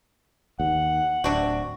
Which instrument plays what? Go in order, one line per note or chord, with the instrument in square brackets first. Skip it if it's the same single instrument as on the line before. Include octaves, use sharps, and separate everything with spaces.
[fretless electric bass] D#2 [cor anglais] F#5
[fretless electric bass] D1 [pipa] C3 D4 F#4